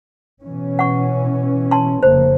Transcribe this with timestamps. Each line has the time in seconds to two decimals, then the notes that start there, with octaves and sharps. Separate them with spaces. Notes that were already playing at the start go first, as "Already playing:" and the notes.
0.43 B2 E3 C#4
0.79 F#5 C#6
1.71 A5 C6
2.03 F1 C#3 A#3 C5